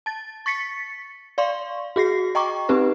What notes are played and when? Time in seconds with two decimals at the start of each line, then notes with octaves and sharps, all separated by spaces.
0.06 A5 A6
0.46 C#6 A6 B6 C#7
1.38 D5 F5 C6 C#6
1.96 F#4 G#4 A#6 C7
2.35 D#5 G5 A#5 C#6 D6
2.69 C4 D#4 G4 B4